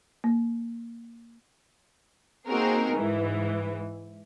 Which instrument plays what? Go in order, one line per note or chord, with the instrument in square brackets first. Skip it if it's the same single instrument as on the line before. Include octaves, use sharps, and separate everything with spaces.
[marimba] A#3
[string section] A#3 C4 D#4 F#4 G#4 A#4
G#2 E3